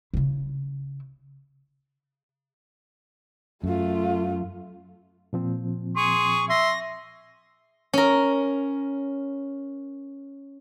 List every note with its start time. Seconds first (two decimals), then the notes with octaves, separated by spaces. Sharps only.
0.14 C#3 E4
3.64 F#2 A3 F4
5.33 A#2 F3 C4
5.96 G#4 C6 C#6
6.50 E5 C6 A#6
7.93 C#4 A#4